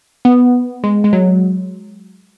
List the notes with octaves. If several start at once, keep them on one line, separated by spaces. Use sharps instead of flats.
B3
G#3
G#3
F#3